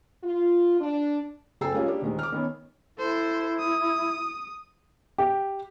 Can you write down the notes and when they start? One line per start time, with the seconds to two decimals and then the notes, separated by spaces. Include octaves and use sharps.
0.24 F4
0.80 D4
1.61 F#1 A4 G5 G#5 E6 C7
1.73 G#3 A#3 C#4 F4 G4 G#4
1.87 G3 A#3 D4 G4
2.02 D#1 D#3 G#3
2.19 D6 F6
2.32 D#3 B3 C#4
2.98 E4 A4 C5
3.60 D#6
5.18 G4